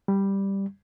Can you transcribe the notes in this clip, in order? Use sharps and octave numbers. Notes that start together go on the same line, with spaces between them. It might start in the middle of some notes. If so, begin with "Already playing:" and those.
G3